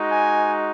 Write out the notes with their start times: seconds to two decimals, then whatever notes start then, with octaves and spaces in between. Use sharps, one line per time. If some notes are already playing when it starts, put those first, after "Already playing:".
Already playing: G#3 D#4 F#4
0.11 G#5